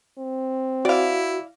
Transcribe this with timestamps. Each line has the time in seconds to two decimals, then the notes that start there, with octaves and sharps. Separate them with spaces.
0.18 C4
0.85 E4 F#4 D5 F5